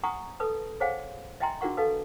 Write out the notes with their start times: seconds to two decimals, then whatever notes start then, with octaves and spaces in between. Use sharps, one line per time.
0.03 F#5 G#5 A#5 C#6 D#6
0.40 A4 B4 A5 D#6
0.80 G#4 C5 C#5 F5 F#5 G#5
1.40 D#5 E5 G5 G#5 A#5 C6
1.61 D4 F#4 G#4 A#4 F#5 C#6
1.77 A4 B4 D#5 F5 A5